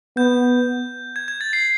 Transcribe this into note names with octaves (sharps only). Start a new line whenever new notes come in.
B3 G6
G#6
G#6
A6
C7